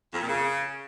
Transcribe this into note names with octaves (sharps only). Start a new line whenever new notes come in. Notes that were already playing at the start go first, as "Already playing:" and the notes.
F2
A#2
C#3